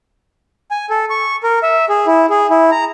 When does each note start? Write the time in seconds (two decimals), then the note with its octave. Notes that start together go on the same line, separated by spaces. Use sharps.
0.71 G#5
0.90 A4
1.10 C#6
1.43 A#4
1.63 E5
1.89 G#4
2.07 E4
2.30 G#4
2.50 E4
2.71 A#5